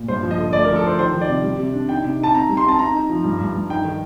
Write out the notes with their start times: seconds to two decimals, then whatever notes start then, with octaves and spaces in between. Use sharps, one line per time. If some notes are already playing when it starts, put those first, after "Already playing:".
Already playing: A#2
0.08 G2 C5
0.23 F3
0.31 D#5
0.38 D3
0.53 A3 D5
0.65 F3 A#4
0.76 A4
0.83 F3 C5
0.98 D#3 C5
1.14 D#3
1.21 D5
1.28 C3
1.43 G3
1.58 C3
1.74 D4
1.89 D#4 G5
2.03 C3
2.19 D#4 A5
2.34 C4 A#5
2.49 G3
2.57 C6
2.64 C4 A5
2.79 D#4 A#5
2.95 D#4
3.10 F3
3.24 G2
3.40 G2
3.54 G2
3.69 D#4 G5
3.85 D#3